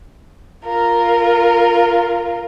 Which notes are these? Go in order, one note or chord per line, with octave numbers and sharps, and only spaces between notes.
F4 A#4